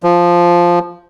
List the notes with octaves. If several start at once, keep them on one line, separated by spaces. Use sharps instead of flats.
F3